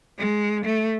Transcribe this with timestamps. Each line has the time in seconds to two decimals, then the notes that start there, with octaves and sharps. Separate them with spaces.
0.19 G#3
0.65 A3